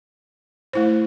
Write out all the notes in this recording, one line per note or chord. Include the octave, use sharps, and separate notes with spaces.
A3 E4 C5